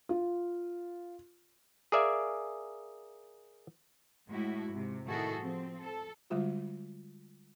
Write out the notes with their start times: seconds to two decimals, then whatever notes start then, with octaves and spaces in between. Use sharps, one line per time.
0.09 F4
1.92 G#4 A#4 D5 E5 F5 G#5
4.29 A2 G#3 E4 F#4
4.73 G#2 C3
5.06 A2 D#3 E4 F#4 G#4 A4
5.37 F3 C4
5.81 A4
6.30 D3 G3 G#3 F4 F#4